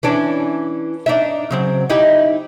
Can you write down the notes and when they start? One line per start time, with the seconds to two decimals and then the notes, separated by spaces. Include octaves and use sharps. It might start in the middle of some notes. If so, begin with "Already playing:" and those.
0.03 E3 C#4 D4
1.06 D4 D#4 E5
1.51 C#3 F#3 C4
1.90 D#4 E4 G4